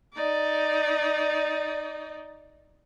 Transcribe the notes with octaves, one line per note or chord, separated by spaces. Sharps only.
D#4 D5